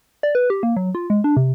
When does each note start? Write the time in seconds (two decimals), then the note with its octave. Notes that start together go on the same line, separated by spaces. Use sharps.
0.23 D5
0.35 B4
0.50 G4
0.63 A#3
0.77 F#3
0.95 F4
1.10 G#3
1.24 D4
1.37 C3